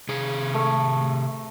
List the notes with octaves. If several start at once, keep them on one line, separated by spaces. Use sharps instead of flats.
C3 G#4
A3